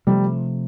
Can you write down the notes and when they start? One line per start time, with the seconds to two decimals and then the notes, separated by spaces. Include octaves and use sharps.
0.07 C3 F3 G3 A3